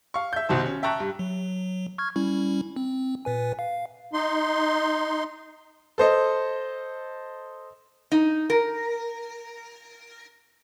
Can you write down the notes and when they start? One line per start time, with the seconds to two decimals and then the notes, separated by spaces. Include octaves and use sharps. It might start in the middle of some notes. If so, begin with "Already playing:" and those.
0.14 F5 C#6
0.33 E5 G6
0.49 C2 B2 D#3 C5
0.66 C#4
0.83 E5 G5 A5 A#5 C#6 F#6
1.00 G2
1.19 F#3
1.98 C#6 F6 G#6
2.16 G3 C#4 E4
2.76 C4
3.25 A#2 B4 G#5
3.59 F5
4.13 D#4 C6
5.98 A4 C5 D#5
8.12 D#4
8.50 A#4